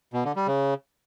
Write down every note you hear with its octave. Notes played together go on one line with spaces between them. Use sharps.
B2
D3
G3
C#3